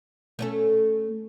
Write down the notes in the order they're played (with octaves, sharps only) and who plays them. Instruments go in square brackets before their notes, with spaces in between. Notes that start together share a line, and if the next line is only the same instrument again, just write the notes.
[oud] A3 C#4 A4